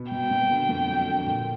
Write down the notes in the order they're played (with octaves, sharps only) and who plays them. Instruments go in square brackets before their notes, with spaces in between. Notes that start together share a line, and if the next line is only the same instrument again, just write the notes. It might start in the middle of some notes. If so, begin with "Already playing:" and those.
Already playing: [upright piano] B2 B3
[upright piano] B2 [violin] G5
[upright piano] B2
D3
F2
F#3
D3
A#2